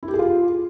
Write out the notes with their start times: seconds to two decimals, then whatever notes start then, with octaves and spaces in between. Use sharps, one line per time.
0.03 E4
0.08 G4
0.14 G#4
0.19 F4